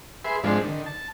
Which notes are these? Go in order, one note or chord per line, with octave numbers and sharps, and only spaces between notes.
G#4 B4 E5 C6
G#2 F3 G#3 C4 D4
D3 D#3
A5